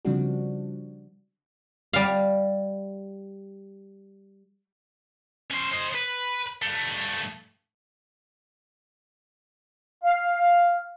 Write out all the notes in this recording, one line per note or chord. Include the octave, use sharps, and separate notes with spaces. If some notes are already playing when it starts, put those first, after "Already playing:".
C#3 F3 G3 C4 D4 F#4
G3 F5
C#4 C5
C5 D#5
B4
G2 A3
F5